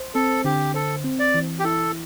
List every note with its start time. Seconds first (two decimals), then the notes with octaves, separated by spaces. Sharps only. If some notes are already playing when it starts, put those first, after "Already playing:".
Already playing: C5
0.15 C4 A4
0.44 D3 G4
0.74 A4 C5
1.04 C4
1.19 D5
1.34 E3
1.59 G4
1.64 E4 A4